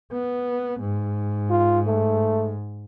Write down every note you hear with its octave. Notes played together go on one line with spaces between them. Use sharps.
B3
G#2
F4
A3